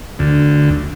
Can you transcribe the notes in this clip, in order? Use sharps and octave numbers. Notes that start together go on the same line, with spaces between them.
D2